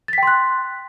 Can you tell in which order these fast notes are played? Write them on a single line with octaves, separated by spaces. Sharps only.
A6 B6 G5 C6 F#6